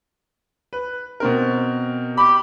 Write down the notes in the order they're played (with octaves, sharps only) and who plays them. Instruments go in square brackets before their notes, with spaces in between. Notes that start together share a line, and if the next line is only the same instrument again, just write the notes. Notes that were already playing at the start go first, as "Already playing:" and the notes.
[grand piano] B4
B2 C4 A#4
[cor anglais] G4 [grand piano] B5